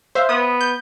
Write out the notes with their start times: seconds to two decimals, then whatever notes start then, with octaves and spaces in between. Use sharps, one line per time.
0.15 C5 E5 F5
0.29 B3 D#6
0.61 G6